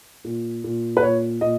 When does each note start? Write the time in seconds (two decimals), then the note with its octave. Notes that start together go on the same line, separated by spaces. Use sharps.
0.24 A#2
0.64 A#2
0.97 B4
1.02 A#2 C#5
1.41 A#2 D#5